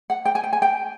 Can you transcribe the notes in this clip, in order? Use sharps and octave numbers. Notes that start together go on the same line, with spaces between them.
F#5
G5
G#5
G5
G#5
G5